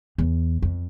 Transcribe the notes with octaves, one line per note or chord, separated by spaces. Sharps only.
E2
F2